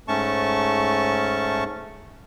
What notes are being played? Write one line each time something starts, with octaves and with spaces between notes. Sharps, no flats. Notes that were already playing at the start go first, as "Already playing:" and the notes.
G#2 A3 C#4 A5 C#6